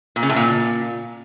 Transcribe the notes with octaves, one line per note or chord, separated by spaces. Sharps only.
A#2
C#3
A2
A#2